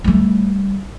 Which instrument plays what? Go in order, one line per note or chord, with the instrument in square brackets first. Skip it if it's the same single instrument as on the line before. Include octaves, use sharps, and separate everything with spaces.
[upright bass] G3 A3